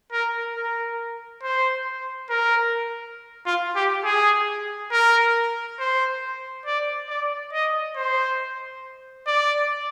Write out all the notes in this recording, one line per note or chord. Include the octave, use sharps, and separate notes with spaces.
A#4
A#4
C5
A#4
F4
G4
G#4
A#4
C5
D5
D5
D#5
C5
D5